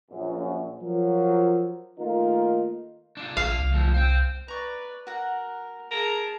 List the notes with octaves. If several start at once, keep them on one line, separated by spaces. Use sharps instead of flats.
A#1 F#2
F3 F#3 A#4
D#3 A3 A#3 D#4 F4 A#4
D4 F4
A#1 F5
C2
D2 F3
C5 G5
B4 D5 A#5 C#6
F#4 A#4 F#5
G#4 A#4 A5